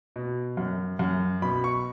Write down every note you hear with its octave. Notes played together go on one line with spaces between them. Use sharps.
B2
F#2
F#2
B2 B5
C#6